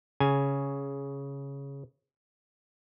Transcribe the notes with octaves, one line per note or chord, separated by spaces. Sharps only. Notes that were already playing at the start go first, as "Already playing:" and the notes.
C#3 G#5